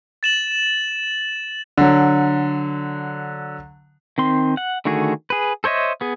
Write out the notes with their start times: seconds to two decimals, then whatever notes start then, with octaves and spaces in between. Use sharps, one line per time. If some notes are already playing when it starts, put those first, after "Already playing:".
0.23 A6 E7 F#7
1.78 D3 F#3
4.18 D#3 C4 C6
4.57 F#5
4.85 D3 D#3 A3 F#4 G#4
5.30 G#4 B4
5.64 A4 C5 C#5 D#5 E5
6.01 B3 G#4